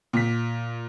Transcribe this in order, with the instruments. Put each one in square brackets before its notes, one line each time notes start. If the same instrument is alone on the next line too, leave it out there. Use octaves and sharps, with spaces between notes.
[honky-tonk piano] A#2 B6